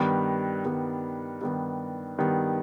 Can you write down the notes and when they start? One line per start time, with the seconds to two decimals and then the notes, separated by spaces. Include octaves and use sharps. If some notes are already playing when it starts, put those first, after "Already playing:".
Already playing: G2 D#3 G3 B3
0.65 G2 D#3 G3 B3
1.41 G2 D#3 G3 B3
2.19 G2 D#3 G3 B3